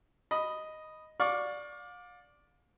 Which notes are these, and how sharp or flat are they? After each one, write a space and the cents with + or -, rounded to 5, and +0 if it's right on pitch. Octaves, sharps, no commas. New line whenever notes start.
D#5 +0 B5 +0
D5 +0 F5 +35 C#6 +0